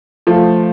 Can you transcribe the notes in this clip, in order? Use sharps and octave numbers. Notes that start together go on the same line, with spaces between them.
F3 A3